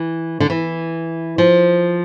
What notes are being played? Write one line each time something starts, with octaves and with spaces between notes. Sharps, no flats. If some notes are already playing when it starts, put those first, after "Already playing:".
Already playing: E3
D3
E3
F3